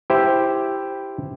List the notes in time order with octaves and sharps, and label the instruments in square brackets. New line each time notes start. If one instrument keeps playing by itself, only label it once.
[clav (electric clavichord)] E4 G4 C5